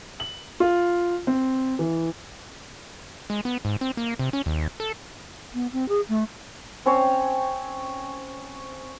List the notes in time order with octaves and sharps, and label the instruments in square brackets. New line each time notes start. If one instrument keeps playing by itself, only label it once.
[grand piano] F#7
F4
C4
E3
[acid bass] G#3
B3
G#2
C4
A#3
C3
C#4
D#2
A4
[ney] B3
C4
G#4
A3
[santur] C4 C#4 C5 C#5